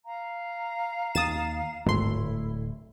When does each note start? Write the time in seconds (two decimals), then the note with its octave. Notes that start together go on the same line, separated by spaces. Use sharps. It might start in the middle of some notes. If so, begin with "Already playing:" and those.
0.06 F5 A#5
1.15 D#2 D#6 A6 E7
1.86 D1 G#1 A3 E4 C6